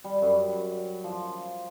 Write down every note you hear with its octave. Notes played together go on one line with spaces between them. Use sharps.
G3
F#2
F3